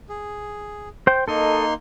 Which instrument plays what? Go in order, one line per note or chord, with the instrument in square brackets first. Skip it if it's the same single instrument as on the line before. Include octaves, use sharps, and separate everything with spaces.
[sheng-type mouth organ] G#4
[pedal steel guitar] C5 G5
[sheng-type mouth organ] A#3 D#4 C6 [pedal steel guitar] A4 D#5